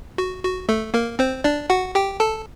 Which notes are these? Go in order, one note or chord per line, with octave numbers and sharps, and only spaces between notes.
F#4
F#4
A3 A4
A#3 A#4
C4 C5
D4 D5
F#4 F#5
G4 G5
A4 A5